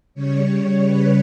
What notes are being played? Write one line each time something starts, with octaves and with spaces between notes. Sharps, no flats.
C#3 G3 C#5
B4